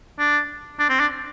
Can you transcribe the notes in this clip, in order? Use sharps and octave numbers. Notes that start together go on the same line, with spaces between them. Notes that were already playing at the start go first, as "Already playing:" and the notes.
D4
D4
C4
D4